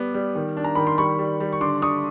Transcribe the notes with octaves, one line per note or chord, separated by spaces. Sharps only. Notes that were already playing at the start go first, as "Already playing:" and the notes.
Already playing: G3 B3 D6
G3
D#3
D4
A#5
D#3 B5
C6
G3 B5 C#6
G3
G3
C#6
D3 C6 D6
D3 C#6 D#6